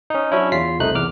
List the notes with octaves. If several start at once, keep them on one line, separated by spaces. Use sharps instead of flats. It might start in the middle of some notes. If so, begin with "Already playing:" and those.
C#4 D#4
F#3 C#4 D4 E4
E2 F4 B6 C7
C2 C3 A3 D#4 F#6
E2 D6 F6